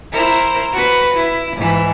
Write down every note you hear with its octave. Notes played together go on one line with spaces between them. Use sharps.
E4 A#4 C5
F#4 B4
E4
G#2 E3